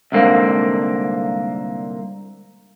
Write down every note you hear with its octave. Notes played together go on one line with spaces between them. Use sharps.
C2 G#2 D3 A#3 C4